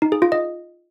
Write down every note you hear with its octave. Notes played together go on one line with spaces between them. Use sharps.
D#4
G#4
F4
D#5